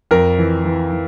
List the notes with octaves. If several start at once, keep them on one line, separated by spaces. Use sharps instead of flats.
F2 A#4
E3
E3
E3